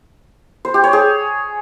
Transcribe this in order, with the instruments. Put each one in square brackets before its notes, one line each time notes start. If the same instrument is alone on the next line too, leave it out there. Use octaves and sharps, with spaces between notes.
[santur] C5
G4
C#5
G#4